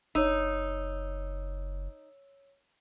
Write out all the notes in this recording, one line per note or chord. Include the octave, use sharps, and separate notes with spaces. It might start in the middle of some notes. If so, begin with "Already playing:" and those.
F#1 D#4 C#5 E6